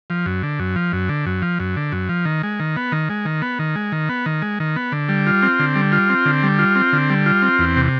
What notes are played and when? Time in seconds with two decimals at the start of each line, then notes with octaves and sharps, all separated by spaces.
0.10 F3
0.26 F#2
0.43 D3
0.59 F#2
0.76 F3
0.93 F#2
1.09 D3
1.26 F#2
1.42 F3
1.60 F#2
1.76 D3
1.92 F#2
2.09 F3
2.25 D#3
2.43 G#3
2.60 D#3
2.77 B3
2.92 D#3
3.10 G#3
3.25 D#3
3.42 B3
3.59 D#3
3.76 G#3
3.92 D#3
4.09 B3
4.26 D#3
4.42 G#3
4.60 D#3
4.76 B3
4.92 D3
5.09 G3
5.27 F4
5.43 C4
5.59 D3
5.75 G3
5.92 F4
6.09 C4
6.25 D3
6.43 G3
6.59 F4
6.75 C4
6.93 D3
7.10 G3
7.26 F4
7.42 C4
7.59 E2
7.76 C3